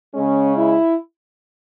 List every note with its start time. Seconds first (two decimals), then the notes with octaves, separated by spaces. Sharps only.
0.14 C#3 G#3 C#4
0.57 E4